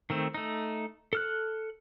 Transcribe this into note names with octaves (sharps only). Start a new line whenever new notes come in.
D#3 A3 C4
A3 D#4
A4 F6 F#6